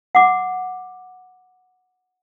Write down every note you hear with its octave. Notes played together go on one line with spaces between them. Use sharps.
F#5 D6